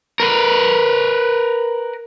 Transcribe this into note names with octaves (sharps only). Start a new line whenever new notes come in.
A#4 B4